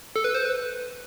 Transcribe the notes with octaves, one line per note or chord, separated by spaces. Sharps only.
A4
B4
C5
B4